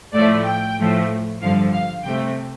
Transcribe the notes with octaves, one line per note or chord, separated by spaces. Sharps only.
A2 F3 A3 D5
G5
A2 F3 A3
G2 D3 F3 F5
F5
C3 A3 G5